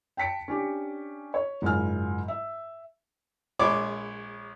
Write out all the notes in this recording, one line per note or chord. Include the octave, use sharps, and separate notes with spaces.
G5 A5 B6 C#7 D7
C#4 D4 G4
C#5
F#1 G#2 G#3 F4 G#5 F6
E5
A#1 G#3 C#5 D5 B5 D6